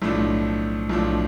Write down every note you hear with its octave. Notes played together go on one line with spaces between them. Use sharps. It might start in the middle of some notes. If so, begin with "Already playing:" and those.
B1 A2 F3 A3 D4
B1 A2 F3 A3 D4